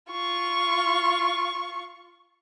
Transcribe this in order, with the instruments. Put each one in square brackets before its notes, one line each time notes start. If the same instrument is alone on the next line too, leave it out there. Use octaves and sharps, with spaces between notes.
[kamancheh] F4 C#6